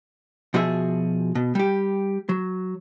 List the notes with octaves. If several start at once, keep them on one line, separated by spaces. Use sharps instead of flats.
B2 F3 F#4 G#4 E5
B2
G3 G4
F#3